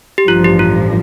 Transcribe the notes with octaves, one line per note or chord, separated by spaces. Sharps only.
G4
A1 G2 F3 F4
G4
F4